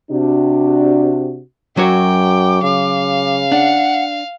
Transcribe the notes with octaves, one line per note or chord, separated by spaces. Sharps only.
C3 D4 F#4
F#2 F#3 F#4 C#5 G5 D6
C#3 F5
D4 F#5